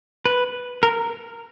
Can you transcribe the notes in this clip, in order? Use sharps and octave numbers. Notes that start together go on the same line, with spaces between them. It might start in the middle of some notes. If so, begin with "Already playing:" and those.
B4
A#4